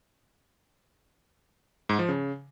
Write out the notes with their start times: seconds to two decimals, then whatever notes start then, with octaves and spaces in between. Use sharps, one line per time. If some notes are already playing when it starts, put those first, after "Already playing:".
1.89 G#2
1.99 F3
2.09 C#3